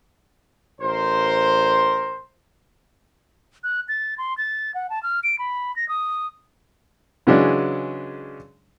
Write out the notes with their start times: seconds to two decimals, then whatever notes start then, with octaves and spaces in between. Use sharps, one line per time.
0.80 A1 A#4 C5
3.64 F#6
3.89 A6
4.18 C6
4.38 A6
4.74 F#5
4.90 A5
5.03 F6
5.24 D7
5.39 B5
5.76 A#6
5.89 D#6
7.27 C#3 E3 F#3 G#3 C#4 D4